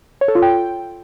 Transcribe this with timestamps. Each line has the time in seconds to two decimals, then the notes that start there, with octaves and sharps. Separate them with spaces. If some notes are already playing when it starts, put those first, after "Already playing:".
0.21 C#5
0.28 A4
0.35 F4
0.42 G5